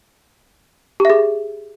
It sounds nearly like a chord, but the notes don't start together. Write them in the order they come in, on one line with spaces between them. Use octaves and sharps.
G4 E5 G#4